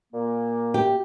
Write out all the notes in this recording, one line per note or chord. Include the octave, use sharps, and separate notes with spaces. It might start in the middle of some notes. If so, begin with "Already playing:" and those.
A#2 A#3
G4